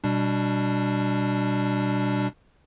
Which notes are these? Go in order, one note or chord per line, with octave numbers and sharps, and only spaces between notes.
B2 G3 D4